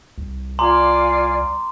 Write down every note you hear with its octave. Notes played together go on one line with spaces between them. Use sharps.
C2
F4 D5 G#5 A#5 C6 D6